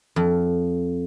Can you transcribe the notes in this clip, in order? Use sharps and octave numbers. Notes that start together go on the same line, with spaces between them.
F2